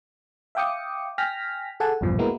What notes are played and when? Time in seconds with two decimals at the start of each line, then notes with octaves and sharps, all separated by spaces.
0.55 E5 F5 G5 D6 D#6 C#7
1.18 G5 G#5 F6 A#6 B6
1.80 G#4 A4 F#5 G#5 A5
2.01 A#1 E2 G2 B2 F3
2.19 G#3 A#3 B3 E4 F#4 A#4